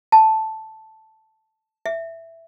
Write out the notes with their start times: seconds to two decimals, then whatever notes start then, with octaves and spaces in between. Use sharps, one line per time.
0.12 A5
1.86 E5